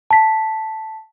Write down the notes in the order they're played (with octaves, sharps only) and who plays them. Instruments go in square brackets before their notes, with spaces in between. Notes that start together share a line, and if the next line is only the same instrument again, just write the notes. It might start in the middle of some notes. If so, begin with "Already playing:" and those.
[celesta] A5 B6